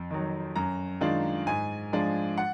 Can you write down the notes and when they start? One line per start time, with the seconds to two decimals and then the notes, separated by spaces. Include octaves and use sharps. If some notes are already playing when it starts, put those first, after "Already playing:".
Already playing: F2
0.11 D#3 F#3
0.56 F#2 A#5
1.01 D#3 G#3 D4 F4
1.46 G#2 G#5
1.93 F3 G#3 D4 F4
2.38 F#5